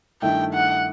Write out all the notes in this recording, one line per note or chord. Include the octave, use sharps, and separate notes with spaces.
G2 D#3 A3 E4 G5
F#5